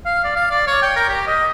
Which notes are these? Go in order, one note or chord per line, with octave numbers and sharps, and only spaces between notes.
F5
D5
F5
D5
C#5
G5
A#4
G4
D#5